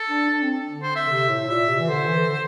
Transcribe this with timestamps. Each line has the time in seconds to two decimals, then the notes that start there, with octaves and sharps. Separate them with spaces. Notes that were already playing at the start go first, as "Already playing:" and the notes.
Already playing: A4
0.09 D4
0.29 D4
0.43 C4
0.69 D3
0.83 C5
0.96 E5
1.08 C3
1.29 A2
1.48 A#2 E5
1.68 C3
1.79 E3
1.89 D3 C5
2.08 E3
2.29 D3